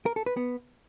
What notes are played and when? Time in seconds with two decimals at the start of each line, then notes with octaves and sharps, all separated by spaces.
0.06 A#4
0.16 A4
0.26 B4
0.37 B3